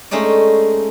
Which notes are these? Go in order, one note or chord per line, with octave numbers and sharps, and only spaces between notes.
G#3 A3 C#4 D#4 D5